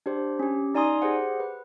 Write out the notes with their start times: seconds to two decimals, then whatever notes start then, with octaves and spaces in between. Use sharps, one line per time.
0.06 D4 G4 C5
0.39 C#4 G4
0.75 D#4 D5 G#5 A#5 C6 D#6
1.02 G4 G#4 C5 F#5
1.40 B4